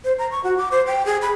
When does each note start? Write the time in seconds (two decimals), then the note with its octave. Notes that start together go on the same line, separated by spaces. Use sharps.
0.04 C5
0.19 A#5
0.31 C#6
0.44 F#4
0.58 D6
0.71 C5
0.87 G5
1.06 G#4
1.22 B5